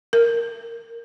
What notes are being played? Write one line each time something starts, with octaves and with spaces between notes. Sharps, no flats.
A#4